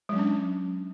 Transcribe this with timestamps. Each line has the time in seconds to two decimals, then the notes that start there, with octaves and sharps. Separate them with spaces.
0.09 G#3
0.13 F#3
0.16 C#4
0.19 D4